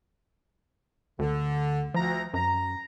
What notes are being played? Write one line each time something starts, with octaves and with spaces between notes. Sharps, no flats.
D2 D3
D2 F3 A#5
F#2 A#5